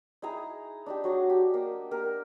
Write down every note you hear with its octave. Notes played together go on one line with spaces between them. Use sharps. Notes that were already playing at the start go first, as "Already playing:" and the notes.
D#4 E4 G#4 A#5
D4 D#4 G4
F#3 F#4 G#4
G4
A#3
A#3 G4 A#4